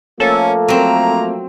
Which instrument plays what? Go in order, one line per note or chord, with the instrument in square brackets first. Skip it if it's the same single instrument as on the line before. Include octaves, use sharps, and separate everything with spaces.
[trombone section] F3 A3 A#3 [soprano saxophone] C#4 [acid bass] A4
[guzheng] F#3 C4 [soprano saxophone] A#5